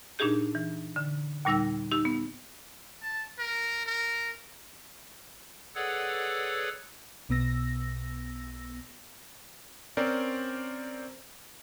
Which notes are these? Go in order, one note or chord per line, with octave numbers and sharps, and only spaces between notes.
A#2 D4 D#4 G4 G#4 G6
E3
D3
D#2 A#2 G3 D#4 E6 A#6
D#4 G4 E6
B3
A5
A#4
A#4
G#4 A4 B4 C#5 D5 F#5
B1 B2 B3 E6 A#6
C4 C#4 A#4 C5 D5